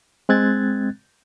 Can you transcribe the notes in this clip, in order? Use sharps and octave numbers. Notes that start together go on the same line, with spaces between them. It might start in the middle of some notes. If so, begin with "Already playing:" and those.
G#3 C4 F#6 G#6 A6